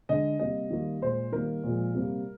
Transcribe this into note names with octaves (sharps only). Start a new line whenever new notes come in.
D3 G#3 D#5
C3 G3 A#3 D#5
D#3 G3 A#3
A#2 G#3 C5
D#3 G3 A#3 A#4
A#2 F3 G#3
C3 G3 A#3